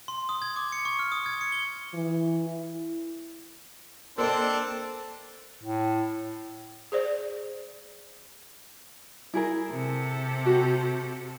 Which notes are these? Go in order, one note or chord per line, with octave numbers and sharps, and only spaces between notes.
C6
D#6
G#6
D6
C#7
C#6
F6
D#6
G#6
C#7
G7
E3
E4
A#3 C4 D4 A4 C5 D5 D#5
A2
G#4 C5 D5
E4 G#4 A#4
C3 A4
F#4 G4